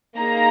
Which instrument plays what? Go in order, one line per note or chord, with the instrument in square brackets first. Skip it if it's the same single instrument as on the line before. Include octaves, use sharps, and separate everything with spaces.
[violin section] A#3 D#4 G#4 A#5